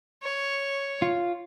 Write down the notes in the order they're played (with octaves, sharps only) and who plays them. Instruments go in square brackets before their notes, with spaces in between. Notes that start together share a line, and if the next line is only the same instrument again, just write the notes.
[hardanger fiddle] C#5
[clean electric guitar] F4